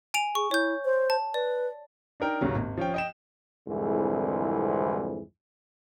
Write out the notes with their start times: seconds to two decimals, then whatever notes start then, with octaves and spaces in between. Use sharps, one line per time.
0.14 G#5 D7 F7
0.35 G#4 C#6
0.51 E4 C#5 G6
0.85 C5
1.10 A5
1.34 B4 D5
2.20 D4 D#4 A#4 G5
2.41 A1 D#2 C#3 F#3
2.55 G#1
2.77 F3 C#4 G5
2.94 D#5 G5 E7
3.68 C2 F2 G#2 D3 E3 G#3